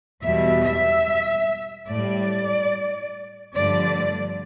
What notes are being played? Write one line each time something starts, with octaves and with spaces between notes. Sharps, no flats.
E2 B2 G3 E5
E5
A2 G3 D5
G2 D3 F3 A3 D5